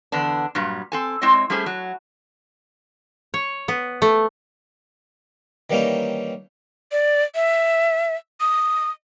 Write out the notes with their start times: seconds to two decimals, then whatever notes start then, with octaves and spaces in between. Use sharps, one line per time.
0.12 E2 D3 B3 D4
0.55 G2 A#2 F#3 G3
0.92 C4 A4 G#5
1.22 G#3 C4 E4 C#5 D#5
1.50 G3 A3 C#4 G4 G#4 C5
1.66 F#3
3.34 C#5
3.68 B3
4.02 A3
5.70 D#3 E3 G3 A#3 C#4 D#4
6.92 D5
7.35 E5
8.40 D#6